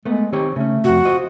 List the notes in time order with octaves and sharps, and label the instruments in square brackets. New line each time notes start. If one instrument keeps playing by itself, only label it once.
[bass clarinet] G#3 [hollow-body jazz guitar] A3 B3
[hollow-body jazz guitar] D#3 C4 C#5 [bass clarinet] G4
[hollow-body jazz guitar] C#3 C#4 [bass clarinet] A3
[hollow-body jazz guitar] F2 C3 [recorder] F#4
[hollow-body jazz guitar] F4 C5 D#5